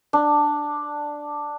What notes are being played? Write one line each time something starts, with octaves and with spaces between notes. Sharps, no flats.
D4